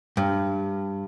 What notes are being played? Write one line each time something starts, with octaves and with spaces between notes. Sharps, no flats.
G2